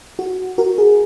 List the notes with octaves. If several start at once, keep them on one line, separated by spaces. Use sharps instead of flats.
F#4
F#4 A#4
G#4